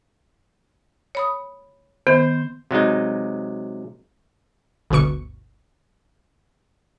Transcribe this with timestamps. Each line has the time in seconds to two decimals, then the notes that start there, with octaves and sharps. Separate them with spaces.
1.15 C#5 B5 D#6
2.07 D#3 B3 C5
2.71 C3 F#3 G#3 D#4
4.90 G1 D2 B2 C#6